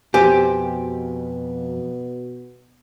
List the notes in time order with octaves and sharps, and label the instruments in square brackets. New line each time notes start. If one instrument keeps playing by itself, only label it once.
[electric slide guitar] F2 [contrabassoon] B2 [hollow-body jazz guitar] G4 C5 [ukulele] G#5